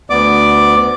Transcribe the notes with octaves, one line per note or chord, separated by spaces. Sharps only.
D2 B3 D5 D6